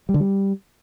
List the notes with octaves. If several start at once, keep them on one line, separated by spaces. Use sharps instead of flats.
G3
D3
G3